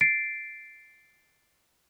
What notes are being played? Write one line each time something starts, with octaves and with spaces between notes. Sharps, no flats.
A6 C7 D7